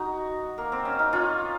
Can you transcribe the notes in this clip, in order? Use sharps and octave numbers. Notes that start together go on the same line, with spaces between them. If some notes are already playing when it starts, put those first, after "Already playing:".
Already playing: D#4 F#4
A#3
C4
C#4
D#4
C#4 F4